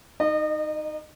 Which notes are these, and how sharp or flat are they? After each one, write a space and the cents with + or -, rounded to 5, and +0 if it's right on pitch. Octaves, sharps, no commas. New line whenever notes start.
D#4 +0 D#5 -35